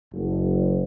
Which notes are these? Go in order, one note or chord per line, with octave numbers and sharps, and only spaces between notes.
F#1